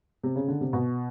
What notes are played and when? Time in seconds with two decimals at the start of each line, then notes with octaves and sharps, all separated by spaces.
0.23 C3
0.36 C#3
0.48 D3
0.61 C3
0.73 B2